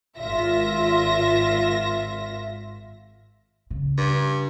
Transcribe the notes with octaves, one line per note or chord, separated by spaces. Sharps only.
G#1 F4 E5 A#6
C#3
G2